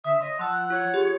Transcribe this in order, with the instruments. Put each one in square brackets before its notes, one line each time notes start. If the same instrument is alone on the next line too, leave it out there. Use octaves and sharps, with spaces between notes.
[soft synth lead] D3 [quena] E5 [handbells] D#6
[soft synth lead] C#5 [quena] D#5 [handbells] C6
[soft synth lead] F3 [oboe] F#5 [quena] A5 [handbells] C6 E6
[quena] F#6
[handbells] F4 C#6 G6 [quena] C#5
[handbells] G4 [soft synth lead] G#4